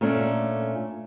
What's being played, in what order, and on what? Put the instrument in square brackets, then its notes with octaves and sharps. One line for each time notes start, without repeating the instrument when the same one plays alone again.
[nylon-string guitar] A#2 A3 C#4 D4